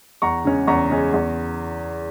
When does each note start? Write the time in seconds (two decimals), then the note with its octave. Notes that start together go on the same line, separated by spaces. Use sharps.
0.22 E2 A#5 C#6
0.44 C#3 G#3 C#4
0.67 E2 A#5 C#6
0.90 C#3 G#3 C#4
1.13 E2